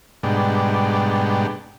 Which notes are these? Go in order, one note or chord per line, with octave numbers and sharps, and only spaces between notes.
G#2 B2 G3 D4